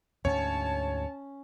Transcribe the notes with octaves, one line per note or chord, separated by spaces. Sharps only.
D2 G#2 C#4 C#5 A5